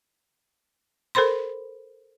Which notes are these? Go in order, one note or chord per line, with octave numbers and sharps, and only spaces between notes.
A4 A#4 C5 B5 C6